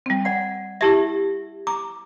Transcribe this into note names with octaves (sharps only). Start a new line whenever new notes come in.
G3 C4
D5 F#5
E4 G4 E5 A5 G#6
A#5 D6